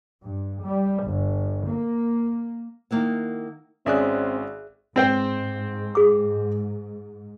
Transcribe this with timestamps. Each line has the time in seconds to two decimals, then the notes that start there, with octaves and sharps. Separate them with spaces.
0.23 G2
0.64 G3
1.05 G1
1.68 A#3
2.91 D#3 A#3 E4 F#5
3.86 G#1 C4 C#4 G#4 D5 E5 F#6
4.96 G#2 C4 C5 G5
5.95 G#4 D6